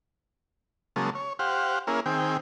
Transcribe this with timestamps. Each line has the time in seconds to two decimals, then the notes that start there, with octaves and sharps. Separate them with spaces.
0.96 C#3 F#3 G#3 A#3 A5
1.15 C#5
1.39 G4 C5 F5 F#5
1.87 A#3 C#4 E4 G#4 A#4
2.06 D#3 C4 G#4 G5